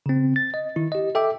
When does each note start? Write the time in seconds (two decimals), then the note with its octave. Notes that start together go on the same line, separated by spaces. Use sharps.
0.06 C#3 C4
0.36 A6
0.54 D#5
0.76 D#3 E4
0.92 G4 D#5
1.15 A4 E5 G5 D6